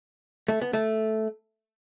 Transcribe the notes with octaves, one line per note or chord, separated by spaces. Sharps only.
A3
B3
A3